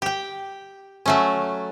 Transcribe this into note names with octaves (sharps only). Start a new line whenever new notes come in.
G4 G5
F#3 A3 C#4